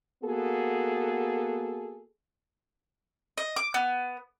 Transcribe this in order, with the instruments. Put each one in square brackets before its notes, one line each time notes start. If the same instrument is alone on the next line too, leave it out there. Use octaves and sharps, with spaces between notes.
[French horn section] A#3 B3 F#4 G#4 A4
[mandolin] D#5
D6
B3